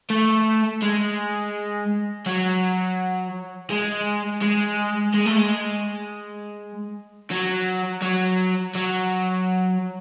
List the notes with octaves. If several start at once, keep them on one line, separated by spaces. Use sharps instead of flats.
A3
G#3
F#3
G#3
G#3
G#3
A3
G#3
F#3
F#3
F#3